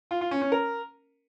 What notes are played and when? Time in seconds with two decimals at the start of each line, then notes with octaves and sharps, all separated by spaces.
0.11 F4
0.21 F4
0.31 C#4
0.42 C#4
0.52 A#4